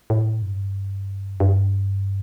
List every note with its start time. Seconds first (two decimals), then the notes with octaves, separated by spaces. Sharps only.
0.10 A2
0.42 G2
1.40 G2